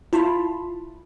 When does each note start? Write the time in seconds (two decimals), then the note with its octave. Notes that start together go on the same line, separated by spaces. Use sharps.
0.13 E4 F4 A5 B5 C6